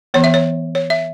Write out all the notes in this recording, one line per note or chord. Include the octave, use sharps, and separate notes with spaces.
E3 B3 C#5
E5
C#5
C#5
E5